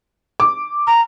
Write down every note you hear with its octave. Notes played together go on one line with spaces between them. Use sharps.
D6
A#5